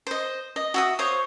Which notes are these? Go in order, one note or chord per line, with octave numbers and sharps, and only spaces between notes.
C5 D#5
D#5
F#4 E5 D#6
C5 C#5 F5 D#6